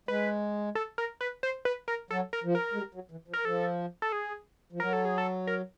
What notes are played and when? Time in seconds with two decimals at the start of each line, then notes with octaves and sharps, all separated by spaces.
0.08 G#3 B4
0.75 A4
0.98 A#4
1.21 B4
1.43 C5
1.65 B4
1.88 A#4
2.11 F#3 A4
2.33 A#4
2.44 F3
2.55 A#4
2.73 G#3
2.78 G3
2.95 F#3
3.11 E3
3.28 F3
3.33 A#4
3.45 F3 A4
4.02 A4
4.12 G#4
4.73 F3
4.80 F#3 A#4
4.93 A4
5.05 G#4
5.18 A4
5.47 A#4